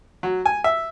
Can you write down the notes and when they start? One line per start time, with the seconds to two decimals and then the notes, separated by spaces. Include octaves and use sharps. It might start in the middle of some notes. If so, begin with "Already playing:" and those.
0.23 F#3
0.46 G#5
0.64 E5